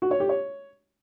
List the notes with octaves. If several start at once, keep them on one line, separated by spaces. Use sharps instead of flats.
F#4
C#5
G4
C#5